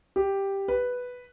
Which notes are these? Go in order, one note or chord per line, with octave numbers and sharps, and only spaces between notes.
G4
B4